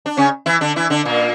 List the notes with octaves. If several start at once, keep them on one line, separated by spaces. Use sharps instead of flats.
D4
C#3 C#4
E3 E4
D3 D4
E3 E4
D3 D4
A#2 A#3